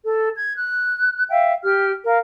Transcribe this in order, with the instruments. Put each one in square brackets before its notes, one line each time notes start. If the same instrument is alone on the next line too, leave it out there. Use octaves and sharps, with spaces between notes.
[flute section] A4
G#6
F#6
E5 F5 G5
G4 F6
A#4 F5